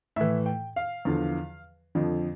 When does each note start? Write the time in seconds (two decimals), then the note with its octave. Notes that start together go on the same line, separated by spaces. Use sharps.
0.16 A2 E3 E5
0.46 G5
0.76 F5
1.05 E2 D3 F3
1.95 F2 D3 F3